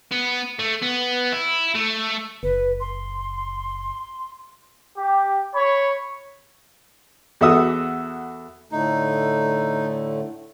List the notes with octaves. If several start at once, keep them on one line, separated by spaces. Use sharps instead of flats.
B3
A3
B3
E4
A3
F#1 B4
C6
G4
C#5 B5
E2 F#4 A4 E5 D#6 E6
A2 D3 A3 D#4